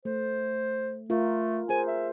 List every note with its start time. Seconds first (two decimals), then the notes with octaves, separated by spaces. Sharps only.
0.05 A3 C5
1.10 A3 F4 A#4
1.69 G#4 A#4 C5 G#5
1.88 E5